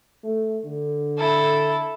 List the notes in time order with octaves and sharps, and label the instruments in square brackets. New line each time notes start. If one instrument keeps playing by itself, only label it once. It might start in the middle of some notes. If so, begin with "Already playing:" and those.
[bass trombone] A3
D3
[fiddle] E4 A4